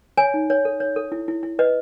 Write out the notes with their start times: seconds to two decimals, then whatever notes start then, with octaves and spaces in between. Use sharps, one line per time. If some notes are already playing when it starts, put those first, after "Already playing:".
0.18 C#5 G#5
0.34 D#4
0.50 C#5
0.65 A4
0.80 C#5
0.96 A4
1.12 E4
1.28 E4
1.43 E4
1.59 B4 D#5